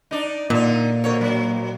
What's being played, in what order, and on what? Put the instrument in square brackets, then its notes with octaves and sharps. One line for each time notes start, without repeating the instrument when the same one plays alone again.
[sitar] D4 D#4
[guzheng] A#2 [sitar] D3 D#4 [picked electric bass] A#3
[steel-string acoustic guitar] B2 C4 A#4 [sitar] D3 C#5
[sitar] F#3